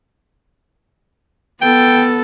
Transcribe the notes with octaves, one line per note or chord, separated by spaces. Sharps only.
B3 A4 G5